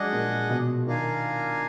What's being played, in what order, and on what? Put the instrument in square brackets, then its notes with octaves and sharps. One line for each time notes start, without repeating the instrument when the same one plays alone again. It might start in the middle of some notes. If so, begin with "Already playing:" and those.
Already playing: [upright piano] F3 F#3 G#3 [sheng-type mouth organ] D4 G#4 D#5 F#5
[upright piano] A#2
B2
[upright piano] D#3 [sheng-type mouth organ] D4 F4 A#4 F5 G#5